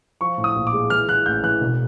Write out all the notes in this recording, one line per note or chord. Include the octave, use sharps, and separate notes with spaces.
F3 C#6
A2
D#6
A#1
D6
G#3
E3 F6
E3 F#6
A1 G6
E3 F#6
E1